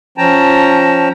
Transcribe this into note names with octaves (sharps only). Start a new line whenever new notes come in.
F3 C#4 G5 A5 A#5